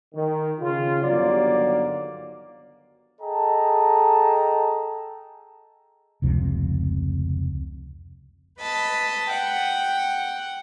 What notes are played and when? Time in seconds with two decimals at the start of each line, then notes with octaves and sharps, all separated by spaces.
0.15 D#3
0.60 C#3 F4
1.03 G1 D#2 F#3 A#3 D5
3.21 G#4 A4 D#5 G5 A5 A#5
6.22 F1 C#2 C3 F3
8.60 B4 D#5 A5 B5
9.30 F#5 G5